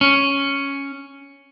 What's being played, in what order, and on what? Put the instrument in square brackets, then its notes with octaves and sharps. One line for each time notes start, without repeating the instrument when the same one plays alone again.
[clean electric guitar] C#4